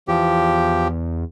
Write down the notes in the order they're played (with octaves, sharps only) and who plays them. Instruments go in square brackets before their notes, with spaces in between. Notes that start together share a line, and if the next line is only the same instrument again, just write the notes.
[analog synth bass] E2 [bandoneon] F3 G4